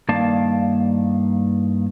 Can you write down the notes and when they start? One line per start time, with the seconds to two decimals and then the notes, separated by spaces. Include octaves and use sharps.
0.09 G2 D#3 A#3 D5 F5 A5